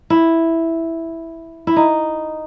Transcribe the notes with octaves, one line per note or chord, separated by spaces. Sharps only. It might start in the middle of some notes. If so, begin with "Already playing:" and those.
E4
E4
D#4